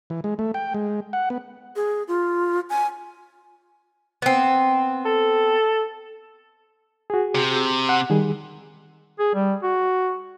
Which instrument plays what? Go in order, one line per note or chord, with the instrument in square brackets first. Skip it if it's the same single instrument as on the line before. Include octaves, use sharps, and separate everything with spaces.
[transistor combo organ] E3
G#3
A3
G5
G#3
F#5
B3
[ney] G#4
F4
G#5
[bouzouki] B3 C4
[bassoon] A4
[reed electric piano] F#4 G#4
[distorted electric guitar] C3
[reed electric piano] F#5
D#3 G3 G#4
[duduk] G#4
G3
F#4